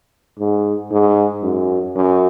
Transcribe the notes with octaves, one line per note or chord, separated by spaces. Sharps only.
G#2
G#2
F#2
F#2